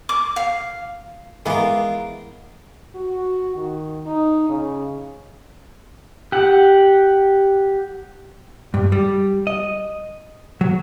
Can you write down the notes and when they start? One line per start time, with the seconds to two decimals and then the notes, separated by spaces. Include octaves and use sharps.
0.09 D6
0.36 F5
1.46 E3 G#3 B3 F4 A#4
2.95 F#4
3.56 D#3
4.06 D#4
4.49 C#3
6.32 G4 F#5
8.74 G2
8.92 G3
9.47 D#5
10.61 F#3